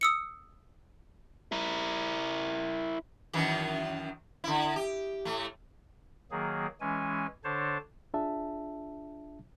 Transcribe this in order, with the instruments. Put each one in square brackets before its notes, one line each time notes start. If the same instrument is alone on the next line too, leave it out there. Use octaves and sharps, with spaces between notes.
[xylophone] D#6 E6 C#7
[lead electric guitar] E4 A#4
[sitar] F#2 D#3 E3
D3 E4
G4
A2 A3
[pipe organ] D#3 F#3 A#3 G#4
E3 G#3 C#4 G#5
D3 D4 C5 C#5 A5
[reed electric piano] D4 F4 G#4 E5 A5